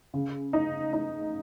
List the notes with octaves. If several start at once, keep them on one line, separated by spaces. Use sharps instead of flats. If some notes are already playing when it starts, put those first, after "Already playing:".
C#3
D#4
D#4